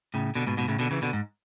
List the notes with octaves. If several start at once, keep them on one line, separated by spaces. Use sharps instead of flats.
A2 C#3
B2 D3
G#2 B2
G#2 B2
A2 C#3
B2 D3
C#3 E3
B2 D3
G#2